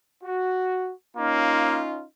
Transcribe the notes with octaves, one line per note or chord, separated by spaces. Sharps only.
F#4
A#3 C#4 D#4 F4